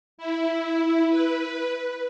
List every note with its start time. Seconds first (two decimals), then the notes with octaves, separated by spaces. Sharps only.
0.18 E4
1.09 B4